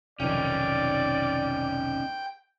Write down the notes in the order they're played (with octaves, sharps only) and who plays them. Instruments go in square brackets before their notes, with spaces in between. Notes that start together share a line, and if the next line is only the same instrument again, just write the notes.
[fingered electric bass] F1 B1 D#3 [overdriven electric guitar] C#4 D#4 [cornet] D5 [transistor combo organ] G5